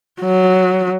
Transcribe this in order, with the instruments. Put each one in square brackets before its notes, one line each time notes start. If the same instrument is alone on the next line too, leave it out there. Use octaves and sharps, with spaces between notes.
[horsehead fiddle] F#3